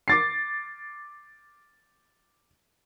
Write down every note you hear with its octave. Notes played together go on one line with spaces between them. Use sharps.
D6 A6 C7